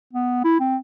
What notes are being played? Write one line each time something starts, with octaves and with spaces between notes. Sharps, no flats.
B3
E4
C4